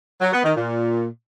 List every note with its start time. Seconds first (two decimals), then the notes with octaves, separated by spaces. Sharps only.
0.21 F#3
0.32 B3
0.44 D#3
0.56 A#2